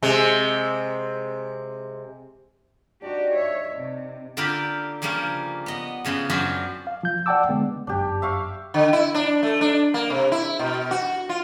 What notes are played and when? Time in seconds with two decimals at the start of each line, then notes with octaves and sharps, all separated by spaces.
0.03 C3 G#3
3.02 D4 D#4 F#4 G4
3.34 C#5 E5
3.76 C3
4.37 D3 A#3 F4 G4 A#4 B5
5.02 C#3 F3 G3 A#3 C#4
5.66 B3 D#5
6.05 F2 C#3 B3 C6
6.30 F#2 F#3 C4 D4 F4 B5
6.87 F5
7.03 F3 G6
7.26 D5 F#5 G5 A5 D6 E6
7.49 D3 G#3 B3
7.87 G1 F#2 D4 G4
8.22 E5 F5 C#6
8.74 D3
8.93 E4
9.14 D4
9.43 A3
9.61 D4
9.94 A#3
10.10 C3
10.32 E4
10.59 B2
10.91 F#4
11.29 F4